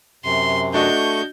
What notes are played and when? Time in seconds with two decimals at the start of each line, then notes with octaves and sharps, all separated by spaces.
0.25 F#2 C3 C6
0.74 A3 D4 F#4 D#5 C#6 G6